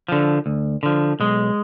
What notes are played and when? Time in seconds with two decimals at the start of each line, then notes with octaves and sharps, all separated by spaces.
0.08 D3 F3
0.46 D2
0.83 D3 F3
1.20 B1 G#3